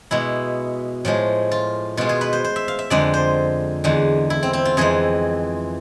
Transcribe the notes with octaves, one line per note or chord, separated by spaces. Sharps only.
B2 G#3 E4
A2 F3 G#3
F4
B2 G#3 F4
G#4
B4
C5
C5
E5
F5
E5
F2 D3 G#3 D5
C5
E2 D3 G#3
E4
C4
C4
F4
F2 E3 G#3 G#4